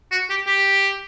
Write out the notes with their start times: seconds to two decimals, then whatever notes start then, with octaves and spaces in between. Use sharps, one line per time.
0.11 F#4
0.30 G4
0.47 G4